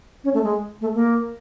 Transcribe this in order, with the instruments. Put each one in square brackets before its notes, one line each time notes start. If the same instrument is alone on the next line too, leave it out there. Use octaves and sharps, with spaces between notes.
[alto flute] C#4
A3
G#3
A3
A#3